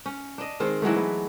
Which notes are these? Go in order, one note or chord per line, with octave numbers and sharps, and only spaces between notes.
C#4
D4 D#5
D#3 G#3 C4
E3 F#3 G#3 A3
B3